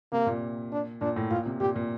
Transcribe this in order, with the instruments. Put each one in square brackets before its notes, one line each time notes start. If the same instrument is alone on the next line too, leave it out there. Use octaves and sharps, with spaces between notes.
[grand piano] C3 [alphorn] A#3
[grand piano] A#2
[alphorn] D4
[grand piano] A#2 [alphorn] D4
[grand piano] A2
[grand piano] A#2 [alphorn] F4
[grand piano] C3
[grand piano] A#2 [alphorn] G4
[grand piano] A#2